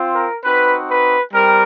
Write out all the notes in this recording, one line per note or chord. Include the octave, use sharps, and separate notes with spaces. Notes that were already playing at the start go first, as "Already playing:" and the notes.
Already playing: C4 F4
A#4
C4 D#4 F#4 B4
B4
G3 C4 A#4